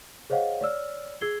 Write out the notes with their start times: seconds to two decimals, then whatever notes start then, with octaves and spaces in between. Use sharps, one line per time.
0.30 G#4 C5 C#5 D#5 F5 F#5
0.61 C#5 D5 E6 F6
1.21 G#4 E6 G#6 C7 G7